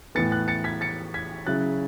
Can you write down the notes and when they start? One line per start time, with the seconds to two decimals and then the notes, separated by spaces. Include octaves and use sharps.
0.15 A2 E3 B3 A6 C#7
0.32 F#6 A6
0.48 A6 C#7
0.64 G#6 B6
0.81 A6 C#7
1.14 G#6 B6
1.47 C#3 F#3 C#4 E4 F#6 A6